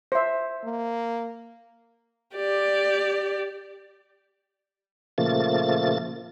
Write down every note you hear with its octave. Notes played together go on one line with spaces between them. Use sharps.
C5 E5
A#3
G4 D5
A#2 C#3 F3 A3 A#3 A6